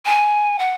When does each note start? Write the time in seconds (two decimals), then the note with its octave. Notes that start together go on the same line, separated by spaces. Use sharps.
0.05 G#5
0.58 F#5